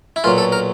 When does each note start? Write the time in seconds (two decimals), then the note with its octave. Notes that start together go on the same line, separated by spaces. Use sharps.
0.16 E4
0.24 B1 A#2 F#3 F4
0.38 A4
0.52 A#4